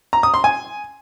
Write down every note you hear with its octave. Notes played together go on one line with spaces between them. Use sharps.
A#5
D#6
C6
G#5